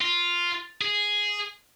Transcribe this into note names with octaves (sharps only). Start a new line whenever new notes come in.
F4
G#4